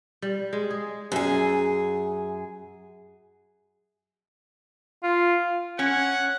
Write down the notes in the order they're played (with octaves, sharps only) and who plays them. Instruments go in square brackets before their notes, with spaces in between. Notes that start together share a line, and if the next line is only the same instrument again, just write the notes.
[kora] G3
G#3
G#4
[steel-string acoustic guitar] F#2 G#4
[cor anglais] F4
[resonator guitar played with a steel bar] C#4 [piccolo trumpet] F#5